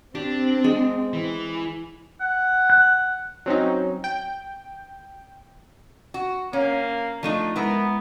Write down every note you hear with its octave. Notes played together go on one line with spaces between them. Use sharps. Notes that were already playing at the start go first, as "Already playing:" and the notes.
C4 D4 G4
G#3
E3
F#5
F#6
F#3 C4 C#4 D#4
G5
F#4
A#3 C#4 C#5
F3 A3 D4 D#4
G#3 B3 E4 A#4